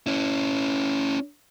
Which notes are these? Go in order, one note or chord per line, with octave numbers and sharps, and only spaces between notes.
C#4 E4